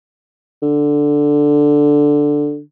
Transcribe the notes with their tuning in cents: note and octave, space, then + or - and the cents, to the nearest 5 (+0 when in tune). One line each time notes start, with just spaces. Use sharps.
D3 +0